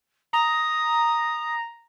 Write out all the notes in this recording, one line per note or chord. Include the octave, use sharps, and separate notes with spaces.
A#5 D#6